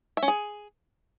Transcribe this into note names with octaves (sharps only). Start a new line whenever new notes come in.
E5
C#4
G#4